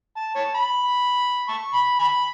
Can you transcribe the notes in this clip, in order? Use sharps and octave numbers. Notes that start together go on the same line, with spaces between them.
A5
C#5 A5
B5
A5 C#6
B5
G#5 B5